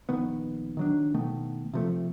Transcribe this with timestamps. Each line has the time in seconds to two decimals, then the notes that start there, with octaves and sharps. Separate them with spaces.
0.09 A#1 D#3 B3
0.77 D#3 F#3 D4
1.14 B2 D#3 A3 B3
1.74 C3 F3 A3